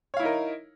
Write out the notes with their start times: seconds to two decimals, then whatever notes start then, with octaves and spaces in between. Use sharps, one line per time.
0.14 C#5
0.17 F5
0.20 E4
0.22 D#4
0.25 A#4